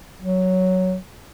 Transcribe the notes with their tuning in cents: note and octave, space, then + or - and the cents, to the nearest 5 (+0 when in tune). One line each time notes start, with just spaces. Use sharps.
F#3 +5